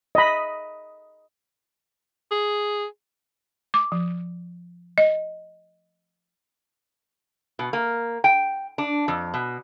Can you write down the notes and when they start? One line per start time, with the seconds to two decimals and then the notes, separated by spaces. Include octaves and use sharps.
0.15 D#5 B5
2.32 G#4
3.74 D6
3.92 F3
4.98 D#5
7.59 B2
7.73 A#3
8.24 G5
8.78 D4
9.08 F2
9.34 B2